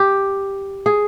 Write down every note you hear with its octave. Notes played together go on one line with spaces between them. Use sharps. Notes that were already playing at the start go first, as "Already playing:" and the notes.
Already playing: G4
G#4